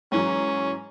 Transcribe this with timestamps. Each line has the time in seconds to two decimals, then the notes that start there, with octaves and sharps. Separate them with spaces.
0.12 G#2 E3 F#3 C#4